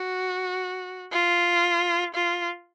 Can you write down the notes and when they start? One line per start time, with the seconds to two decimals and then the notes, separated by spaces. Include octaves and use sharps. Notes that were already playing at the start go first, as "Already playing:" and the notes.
Already playing: F#4
1.12 F4
2.14 F4